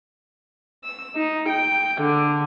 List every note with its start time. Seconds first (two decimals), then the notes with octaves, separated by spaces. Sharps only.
0.84 E6
1.15 D#4
1.49 G5
2.01 D3